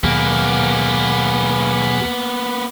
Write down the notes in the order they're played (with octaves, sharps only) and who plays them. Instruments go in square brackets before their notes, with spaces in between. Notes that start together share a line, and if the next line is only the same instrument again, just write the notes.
[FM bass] D#2 [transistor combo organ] B2 F#3 G#4 [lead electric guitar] A#3 B3